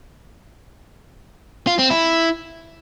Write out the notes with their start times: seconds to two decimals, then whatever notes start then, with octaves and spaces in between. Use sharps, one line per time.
1.67 F4
1.79 C4
1.90 E4